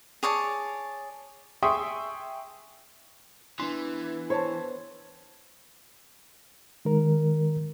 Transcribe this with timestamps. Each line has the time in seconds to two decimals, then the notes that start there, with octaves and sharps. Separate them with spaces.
0.23 G#4 C#5 D5 A5
1.63 G#4 E5 G5 C6 C#6 D#6
3.60 E3 B3 D4 C6
4.30 C5 C#5 A5
6.85 D#3 G#3 A#4